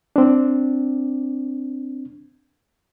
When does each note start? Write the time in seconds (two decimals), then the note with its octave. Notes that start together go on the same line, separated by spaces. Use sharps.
0.16 C4 D4